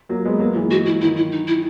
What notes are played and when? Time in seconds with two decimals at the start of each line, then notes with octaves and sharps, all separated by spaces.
0.09 F#3 A#3
0.25 G#3 B3
0.40 F#3 A#3
0.56 E3 G#3
0.71 F#4
0.86 E4
1.02 D#3 F#3 E4
1.17 E4
1.32 D#4
1.47 E4